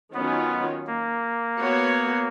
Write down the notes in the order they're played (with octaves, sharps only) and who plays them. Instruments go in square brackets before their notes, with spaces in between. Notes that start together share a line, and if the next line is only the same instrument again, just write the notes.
[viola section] D#3 F#3 C#4 F4 [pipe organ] B3
[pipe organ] A#3
[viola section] B3 F#4 C#5